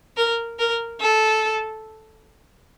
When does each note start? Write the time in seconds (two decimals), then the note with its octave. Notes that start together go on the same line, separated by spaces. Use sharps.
0.17 A#4
0.59 A#4
1.00 A4